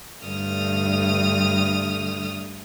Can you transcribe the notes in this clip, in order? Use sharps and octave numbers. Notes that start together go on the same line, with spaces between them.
G2 D3 A3 D#6 F6